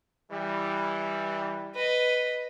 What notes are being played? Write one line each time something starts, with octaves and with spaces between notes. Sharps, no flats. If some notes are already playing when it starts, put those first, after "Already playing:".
E3 G3
B4 D#5